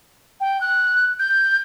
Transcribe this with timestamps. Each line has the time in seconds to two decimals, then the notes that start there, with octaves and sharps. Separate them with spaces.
0.40 G5
0.61 F#6
1.19 G6